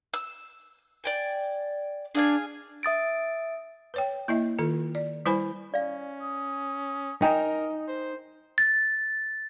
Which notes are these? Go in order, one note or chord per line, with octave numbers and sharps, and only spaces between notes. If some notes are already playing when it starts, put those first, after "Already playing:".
E6
D5 G5 G#5
D4 G#4 F5 G#5
E5 D#6 A6 D7
B4 C#5 G5
A#3 E4 D#5 E5
D#3 F4 A4
D5
G3 E4 B4 C5 G#5 B5
C#4 D5 F5
D#6
D#4 A#4 D#5 G5 G#5 A#5
C5
A6